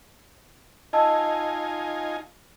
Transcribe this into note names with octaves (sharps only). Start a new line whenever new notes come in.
D#4 F4 D#5 G#5 A5 E6